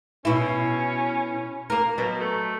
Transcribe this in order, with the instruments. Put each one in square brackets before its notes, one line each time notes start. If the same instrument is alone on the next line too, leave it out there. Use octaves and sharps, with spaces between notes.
[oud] B2 E4 [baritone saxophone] C#4
[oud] A#3 A#4
[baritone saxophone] B2 [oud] F#3
[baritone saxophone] A3